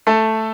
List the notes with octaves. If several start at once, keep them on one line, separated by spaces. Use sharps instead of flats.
A3 A4